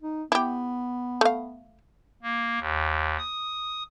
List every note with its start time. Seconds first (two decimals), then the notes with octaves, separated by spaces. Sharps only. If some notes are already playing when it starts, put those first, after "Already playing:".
0.03 D#4
0.32 B3 E4 G4
1.21 A3 F5
2.23 A#3
2.59 D#2
3.18 D#6